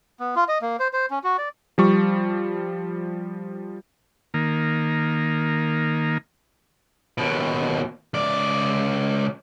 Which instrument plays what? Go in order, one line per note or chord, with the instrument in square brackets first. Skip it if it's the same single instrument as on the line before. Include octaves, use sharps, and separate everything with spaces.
[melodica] B3
F4
D#5
A#3
C5
C5
C#4
F#4
D5
[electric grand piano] F3 G3 C#6
[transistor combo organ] D#3 A#3
[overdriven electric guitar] D#2 B2
C#2 D5